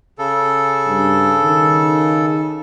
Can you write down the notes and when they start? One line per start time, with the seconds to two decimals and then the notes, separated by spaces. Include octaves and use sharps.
0.19 C#3 A4
0.87 G2
1.43 D#3